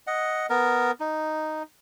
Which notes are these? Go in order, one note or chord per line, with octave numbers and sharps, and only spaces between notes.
D#5 F#5
B3 A#4
D#4